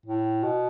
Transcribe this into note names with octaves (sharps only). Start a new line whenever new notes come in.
A2
B2